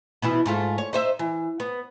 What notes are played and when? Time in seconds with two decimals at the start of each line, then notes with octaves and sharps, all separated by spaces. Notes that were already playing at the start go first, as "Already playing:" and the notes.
0.22 B2 E3 E4
0.46 G#2 A3 F4
0.78 C#5
0.93 D#4 C5 E5
1.19 E3
1.60 B3